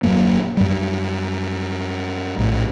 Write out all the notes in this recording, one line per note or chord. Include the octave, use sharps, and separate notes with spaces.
D#1 F#2 A#3
F#2 G3
A#1 A2